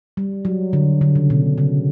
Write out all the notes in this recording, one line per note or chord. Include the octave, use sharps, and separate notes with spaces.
G3
F#3
D3
D3
C#3
B2
C#3